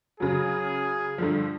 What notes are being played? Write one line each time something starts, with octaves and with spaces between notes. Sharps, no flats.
C#3 F#3 G#4
G2 D3 F3